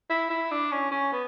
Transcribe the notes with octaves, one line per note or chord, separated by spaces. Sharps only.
E4
E4
D4
C#4
C#4
B3